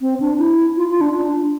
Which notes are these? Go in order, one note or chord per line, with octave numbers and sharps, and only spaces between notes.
C4
D4
E4
F4
F4
D4
D4